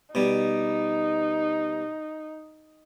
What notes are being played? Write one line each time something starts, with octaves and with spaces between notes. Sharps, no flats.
B2 G3 D#4